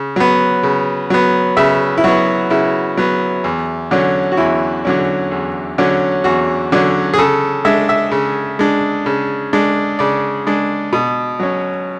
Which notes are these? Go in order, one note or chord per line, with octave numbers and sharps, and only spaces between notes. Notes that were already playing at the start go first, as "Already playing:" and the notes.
Already playing: C#3
F#3 B3
C#3
F#3 B3
C#3 E5
E4
F#3 B3 F#4
C#3 E4
F#3 B3
E2
D3 F#3 C#4
F#4
E2 E4
D3 F#3 C#4
E2
D3 F#3 C#4
E2 F#4
D3 F#3 C#4
G#4
C#3 A4
G#3 D4 E5
E5
C#3
G#3 D4
C#3
G#3 D4
C#3 D5
G#3 D4
B2
F#3 C#4